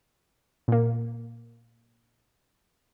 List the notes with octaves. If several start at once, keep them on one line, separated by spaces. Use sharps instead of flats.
A#2 A#3